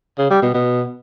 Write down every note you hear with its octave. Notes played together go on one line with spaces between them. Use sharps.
C#3
G3
B2
B2